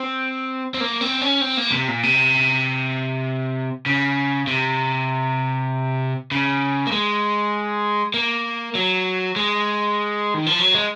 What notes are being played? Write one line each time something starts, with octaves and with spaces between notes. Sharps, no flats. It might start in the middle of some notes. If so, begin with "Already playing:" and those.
Already playing: C4
C4
A#3
C4
C#4
C4
A#3
C3
A#2
C3
C#3
C3
C#3
A#3
G#3
A#3
F#3
G#3
D#3
F3
F#3
G#3